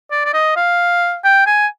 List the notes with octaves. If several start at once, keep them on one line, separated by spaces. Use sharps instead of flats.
D5
D5
D#5
F5
G5
G#5